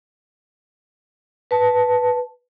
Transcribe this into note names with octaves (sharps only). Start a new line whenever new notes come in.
B4 A5